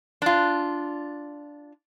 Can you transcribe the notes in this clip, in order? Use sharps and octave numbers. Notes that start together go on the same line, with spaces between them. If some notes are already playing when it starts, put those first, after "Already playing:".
D4 F4